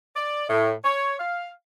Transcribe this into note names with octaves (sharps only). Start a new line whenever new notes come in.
D5
A2
C#5
F5